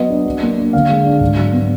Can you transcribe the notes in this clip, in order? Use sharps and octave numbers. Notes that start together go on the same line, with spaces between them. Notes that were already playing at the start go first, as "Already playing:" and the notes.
Already playing: F#3 B3 D#5
D4
F#3
A#3
D4
D3 F5
G#3
D4
G#2
F#3
B3